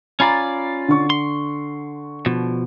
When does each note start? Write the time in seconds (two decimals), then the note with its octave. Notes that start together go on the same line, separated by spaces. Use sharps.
0.20 C#4 F4 D5 G#5 A#5 B5
0.88 D3 C#6
1.10 C6
2.26 B2 F3